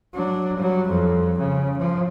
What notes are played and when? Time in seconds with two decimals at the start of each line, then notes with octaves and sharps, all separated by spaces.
0.13 F#3 D4
0.57 F#3 G3
0.89 F2
1.39 C#3
1.78 F3